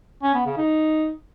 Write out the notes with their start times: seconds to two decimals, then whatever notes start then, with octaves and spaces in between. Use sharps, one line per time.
0.23 C#4
0.34 B3
0.46 C#3
0.57 D#4